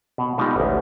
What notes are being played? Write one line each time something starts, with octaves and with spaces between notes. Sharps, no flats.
B2
B2 G3 G#3 D#4 F4 G4
A1 D2